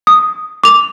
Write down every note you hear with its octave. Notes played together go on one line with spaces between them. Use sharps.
D#6
D6 F7